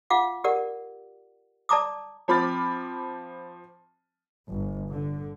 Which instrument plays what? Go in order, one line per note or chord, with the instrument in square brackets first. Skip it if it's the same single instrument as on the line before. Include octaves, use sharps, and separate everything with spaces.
[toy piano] F4 F5 F#5 D6
G4 A#4 D5 F#5
D5 A5 A#5 D6 D#6
[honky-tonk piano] F3 C4 B5 D6 F6 A6
[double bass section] G1
D3